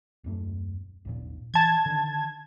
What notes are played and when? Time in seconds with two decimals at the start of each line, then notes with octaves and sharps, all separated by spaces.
0.24 D#1 F#2 A3
1.05 G#1 D#2 A#2
1.54 E3 A5 G#6
1.86 D3 D#3